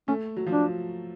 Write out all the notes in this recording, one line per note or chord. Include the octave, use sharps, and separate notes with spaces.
A3 C#4
F#3
F3
D4